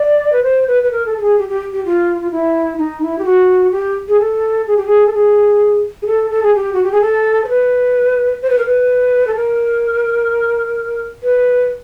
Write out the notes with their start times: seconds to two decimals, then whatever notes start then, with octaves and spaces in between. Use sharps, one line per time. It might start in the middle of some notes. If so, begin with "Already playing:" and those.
Already playing: D5
0.32 B4
0.43 C5
0.67 B4
0.83 B4
0.91 A#4
1.06 A4
1.17 A4
1.21 G#4
1.38 G4
1.49 G4
1.72 G4
1.85 F4
2.21 F4
2.31 E4
2.78 D#4
3.02 E4
3.18 G4
3.25 F#4
3.72 G4
4.08 G#4
4.19 A4
4.67 G#4
4.76 G4
4.86 G#4
5.06 A4
5.14 G#4
6.02 G#4
6.06 A4
6.30 A4
6.43 G#4
6.54 G4
6.73 F#4
6.83 G4
6.91 G#4
7.01 A4
7.44 C5
7.48 B4
8.42 C5
8.50 B4
8.58 A#4
8.65 B4
9.27 A4
9.36 A#4
11.23 B4